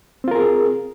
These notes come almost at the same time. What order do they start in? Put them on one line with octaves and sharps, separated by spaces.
C4 F4 A#4 G#4